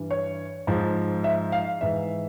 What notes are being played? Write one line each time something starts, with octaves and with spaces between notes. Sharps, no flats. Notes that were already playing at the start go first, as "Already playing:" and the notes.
Already playing: G2 E3
C#5
G#2 F3
E5
F5
G#2 E3 E5